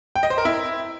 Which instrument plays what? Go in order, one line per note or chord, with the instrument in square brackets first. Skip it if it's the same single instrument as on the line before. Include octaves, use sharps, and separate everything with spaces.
[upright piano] G5
D#5
C5
A#4
E4